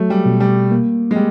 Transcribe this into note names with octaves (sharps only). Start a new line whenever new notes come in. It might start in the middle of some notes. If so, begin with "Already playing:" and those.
Already playing: F#3 A3
G3
B2
G3
A#3
G#3
G3